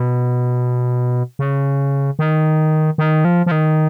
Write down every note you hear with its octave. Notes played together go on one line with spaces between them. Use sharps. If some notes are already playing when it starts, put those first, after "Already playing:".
Already playing: B2
C#3
D#3
D#3
F3
F3
D#3